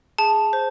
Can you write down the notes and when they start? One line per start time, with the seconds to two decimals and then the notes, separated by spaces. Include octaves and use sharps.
0.18 G#4 A5
0.53 C5